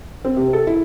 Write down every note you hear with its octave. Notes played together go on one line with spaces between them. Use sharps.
C4
C3
A4
E4